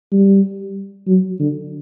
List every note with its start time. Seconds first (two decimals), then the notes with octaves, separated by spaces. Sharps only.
0.12 G3
1.07 F#3
1.39 D3